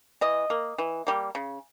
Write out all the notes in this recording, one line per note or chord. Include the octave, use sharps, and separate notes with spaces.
E3 D#5
A#3
E3
G3 A#3
C#3